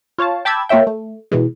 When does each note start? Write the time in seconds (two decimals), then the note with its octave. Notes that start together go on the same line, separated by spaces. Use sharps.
0.18 F4 C#5 F5 A5
0.45 G5 A5 B5 D6 E6 G#6
0.69 A#3 F4 C#5 E5 G5
0.87 A3
1.31 B2 E3 G#3